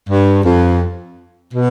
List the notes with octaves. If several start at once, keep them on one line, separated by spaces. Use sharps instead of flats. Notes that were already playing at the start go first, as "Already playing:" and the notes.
G2
F2
B2